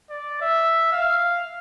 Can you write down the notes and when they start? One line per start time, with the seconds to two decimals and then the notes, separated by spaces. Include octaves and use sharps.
0.10 D5
0.41 E5
0.92 F5